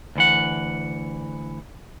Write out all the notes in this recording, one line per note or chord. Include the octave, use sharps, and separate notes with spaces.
D2 E3 F#5